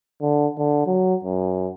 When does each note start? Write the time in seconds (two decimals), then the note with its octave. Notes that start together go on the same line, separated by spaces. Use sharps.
0.22 D3
0.58 D3
0.87 F#3
1.24 F#2